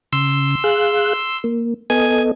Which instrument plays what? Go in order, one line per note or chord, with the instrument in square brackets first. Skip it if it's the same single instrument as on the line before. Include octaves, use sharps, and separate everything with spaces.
[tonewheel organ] C#3 [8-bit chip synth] C6 E6
[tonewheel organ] G#4 F5 F#6
A#3
[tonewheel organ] B3 A4 D#5 [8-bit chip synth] G#5
[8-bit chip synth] G#5